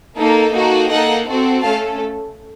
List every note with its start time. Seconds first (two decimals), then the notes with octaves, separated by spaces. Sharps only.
0.16 A#3 D#4 A4
0.52 A#3 D#4 F#4 A4
0.89 A#3 D#4 A4 D#5 F#5
1.27 C4 F#4 A4
1.63 A3 C#4 A4 F5 A5